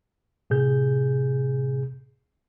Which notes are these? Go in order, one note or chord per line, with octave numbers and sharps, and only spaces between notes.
A2 C3 G#4 G6